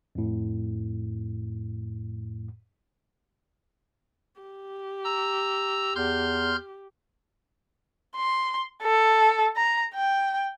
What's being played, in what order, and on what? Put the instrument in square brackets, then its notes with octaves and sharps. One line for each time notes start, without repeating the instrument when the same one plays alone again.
[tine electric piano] F2 A2
[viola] G4
[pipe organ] A#5 E6
[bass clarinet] E2 [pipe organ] C6 F6 G6
[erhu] C6
A4
A#5
G5